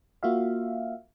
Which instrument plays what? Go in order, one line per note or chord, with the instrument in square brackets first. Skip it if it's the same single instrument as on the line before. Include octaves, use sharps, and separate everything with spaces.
[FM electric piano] A#3 F4 F#4 E5 F5